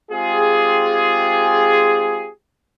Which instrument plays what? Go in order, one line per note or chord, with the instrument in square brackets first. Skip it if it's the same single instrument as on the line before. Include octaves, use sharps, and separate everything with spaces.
[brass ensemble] G#3 C4 F4 G4 G#4